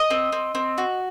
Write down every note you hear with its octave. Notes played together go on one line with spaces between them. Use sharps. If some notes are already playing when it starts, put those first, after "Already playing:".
Already playing: D#5
C4
C4
C4
F#4